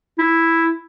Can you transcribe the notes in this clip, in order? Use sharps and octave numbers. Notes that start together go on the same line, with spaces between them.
E4